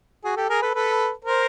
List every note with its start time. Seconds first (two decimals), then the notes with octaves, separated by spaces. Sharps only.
0.25 F#4 G#4
0.37 G4 A4
0.49 G#4 A#4
0.62 A4 B4
0.75 A4 B4
1.25 A#4 C5